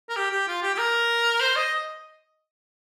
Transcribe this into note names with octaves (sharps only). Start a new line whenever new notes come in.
A#4
G4
G4
F4
G4
G4
A#4
C5
D#5